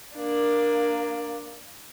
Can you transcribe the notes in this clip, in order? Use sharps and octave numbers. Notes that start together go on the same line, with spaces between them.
A#3 D4